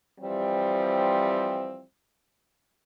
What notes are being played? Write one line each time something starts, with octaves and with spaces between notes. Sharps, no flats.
E3 F3 G3 C4